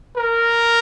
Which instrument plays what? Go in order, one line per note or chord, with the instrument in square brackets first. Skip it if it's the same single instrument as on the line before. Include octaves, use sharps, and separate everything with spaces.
[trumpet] A#4